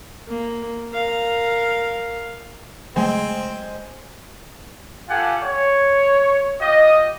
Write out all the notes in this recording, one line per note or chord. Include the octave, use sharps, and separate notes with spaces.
A#3
A#4 F5
C#3 F#3 G#3 A3 C4 C5 G#5
F4 G4 A4 F#5 G#5
C#5
F4 G4 D#5